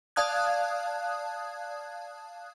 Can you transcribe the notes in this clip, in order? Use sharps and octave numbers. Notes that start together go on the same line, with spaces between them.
D5 F5 A5 D#6 F#6 G#6